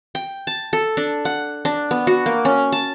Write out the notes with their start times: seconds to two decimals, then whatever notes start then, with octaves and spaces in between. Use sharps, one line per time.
0.15 G5
0.47 A5
0.73 A4
0.97 D4
1.25 F#5
1.65 D4
1.91 B3
2.07 F#4
2.26 A#3
2.45 C#4
2.72 A5